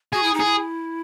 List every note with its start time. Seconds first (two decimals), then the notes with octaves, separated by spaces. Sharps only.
0.13 F#4 G#4
0.23 E4
0.34 D#4
0.40 E4 G#4